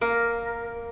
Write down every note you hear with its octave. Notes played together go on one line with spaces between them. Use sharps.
A#3 A#4